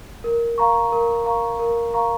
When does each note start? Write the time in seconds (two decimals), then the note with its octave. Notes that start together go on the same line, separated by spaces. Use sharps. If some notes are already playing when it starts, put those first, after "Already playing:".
0.24 A#4
0.58 F5 A#5 C#6
0.92 A#4
1.26 F5 A#5 C#6
1.59 A#4
1.94 F5 A#5 C#6